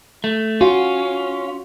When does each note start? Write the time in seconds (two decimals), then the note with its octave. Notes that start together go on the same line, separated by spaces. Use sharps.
0.24 A3
0.61 C#4 F4 F#4